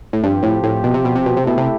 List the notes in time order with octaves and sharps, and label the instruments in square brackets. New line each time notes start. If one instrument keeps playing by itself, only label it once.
[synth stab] A2
[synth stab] G2 [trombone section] F3 C4 G4 C5
[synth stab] A2
A2
B2
C3
B2
C3
B2
C3
[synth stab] B2 [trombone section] A3 E4 G4
[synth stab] C3